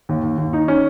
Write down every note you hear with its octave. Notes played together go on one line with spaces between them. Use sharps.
D#2
D#2
D#2
D#4
C#4